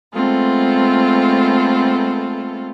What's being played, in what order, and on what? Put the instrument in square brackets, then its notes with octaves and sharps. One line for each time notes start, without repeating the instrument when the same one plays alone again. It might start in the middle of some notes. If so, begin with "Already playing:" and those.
[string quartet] G#3 A3 B3 C4 F4 A4